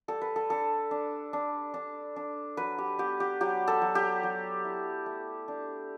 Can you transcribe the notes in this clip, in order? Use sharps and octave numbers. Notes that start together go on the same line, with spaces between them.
G3 A4
B4
A4
D4 A4
D4
D4
D4
D4
F#3 B4
G4
B3 G4
G4
F#3 G4
A4
F#3
G4
F#3
E4
A3
D4